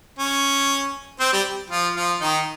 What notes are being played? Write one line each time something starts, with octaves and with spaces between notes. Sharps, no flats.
C#4
C4 C5
G3 G4
F3 F4
F3 F4
D#3 D#4